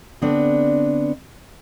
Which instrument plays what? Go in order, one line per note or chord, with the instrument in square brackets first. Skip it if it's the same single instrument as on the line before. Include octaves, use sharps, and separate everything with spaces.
[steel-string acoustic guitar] D3 B3 C4 D4